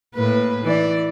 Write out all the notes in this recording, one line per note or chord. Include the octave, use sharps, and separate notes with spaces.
A2 A#3 B4
E3 D5